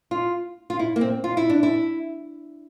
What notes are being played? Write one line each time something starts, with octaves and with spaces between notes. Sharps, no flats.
F4
F4
E4
A#3
C4
F4
E4
D4
E4